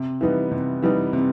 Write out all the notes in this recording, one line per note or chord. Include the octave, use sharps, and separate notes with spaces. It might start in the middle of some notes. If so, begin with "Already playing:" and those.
Already playing: C3
E3 G3 B3 D#4
C3
E3 G3 B3 D#4
C3